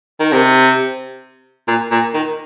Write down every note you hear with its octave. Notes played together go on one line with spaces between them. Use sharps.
D#3
C3
A#2
A#2
D#3